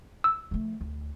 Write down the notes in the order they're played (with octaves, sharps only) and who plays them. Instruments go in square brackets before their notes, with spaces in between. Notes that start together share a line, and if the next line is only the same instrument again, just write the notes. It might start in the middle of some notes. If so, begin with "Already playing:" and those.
[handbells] E6
[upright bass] F3 A3
D2